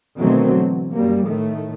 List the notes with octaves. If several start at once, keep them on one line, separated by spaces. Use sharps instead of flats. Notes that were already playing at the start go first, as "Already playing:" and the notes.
B2 D3 D#3 F#3 A3 C4
E3
F#2 G3 A#3
A2 D#3 A3